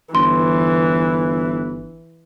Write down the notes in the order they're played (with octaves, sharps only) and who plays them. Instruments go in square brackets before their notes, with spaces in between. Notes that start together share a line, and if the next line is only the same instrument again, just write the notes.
[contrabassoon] G1 [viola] E3 [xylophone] C6